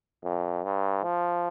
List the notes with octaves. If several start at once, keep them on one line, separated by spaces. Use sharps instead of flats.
F2
G2
F3